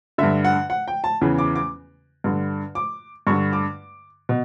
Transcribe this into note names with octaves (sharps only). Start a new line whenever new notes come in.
G2 D3 E5
F#5
F#5
G5
A5
E2 C#3 E3
D6
D6
G2 D3
D6
G2 D3 C#6
D6
B2